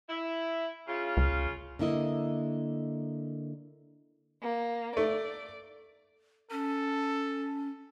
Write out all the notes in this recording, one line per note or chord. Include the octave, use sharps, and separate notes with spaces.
E4
C#3 F4
C#2
D3 A#3 E4 D#5
A#3
A3 D5
C#4 A4